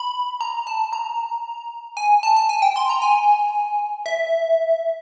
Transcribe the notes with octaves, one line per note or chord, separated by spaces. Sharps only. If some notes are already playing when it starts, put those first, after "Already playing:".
Already playing: B5
A#5
A5
A#5
G#5
A5
A5
G#5
G5
C6
A#5
G#5
E5